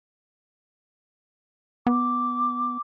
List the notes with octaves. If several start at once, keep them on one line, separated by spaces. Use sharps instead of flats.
B3 D6